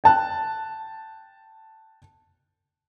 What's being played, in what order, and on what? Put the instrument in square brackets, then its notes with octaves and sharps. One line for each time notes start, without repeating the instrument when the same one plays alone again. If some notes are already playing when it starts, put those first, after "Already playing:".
[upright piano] G5 A5 F#6